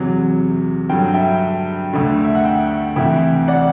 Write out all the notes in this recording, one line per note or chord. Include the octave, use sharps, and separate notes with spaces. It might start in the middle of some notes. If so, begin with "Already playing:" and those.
Already playing: E2 C3 F#3
G2 D3 F#3 G5
E5 G5
D2 D3 A3
E5
F#5
E5 G5
D2 C3 E3 E5 G5
D5 F#5